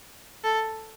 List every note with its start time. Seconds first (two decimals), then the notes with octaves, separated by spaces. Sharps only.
0.44 A4